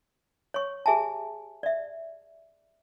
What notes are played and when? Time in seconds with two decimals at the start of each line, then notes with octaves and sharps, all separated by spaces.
0.54 C#5 C#6
0.86 G4 G#4 E5 G#5 A5
1.63 D5 E5